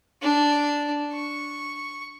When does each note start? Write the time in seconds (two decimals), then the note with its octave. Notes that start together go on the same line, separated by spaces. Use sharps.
0.22 D4
1.13 C#6